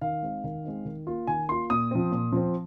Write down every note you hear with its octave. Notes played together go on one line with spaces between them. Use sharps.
D#3 F5
G#3 C4 D#4
D#3
G#3 C4 D#4
D#3
A#3 F4
D#3 G#5
A#3 F4 C6
A#2 D#6
F3 C4
A#2
F3 C4